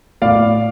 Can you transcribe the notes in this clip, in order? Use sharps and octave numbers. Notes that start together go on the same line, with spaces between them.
A2 D5 F5